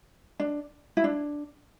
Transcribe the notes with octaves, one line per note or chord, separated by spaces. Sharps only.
D4
E4
D4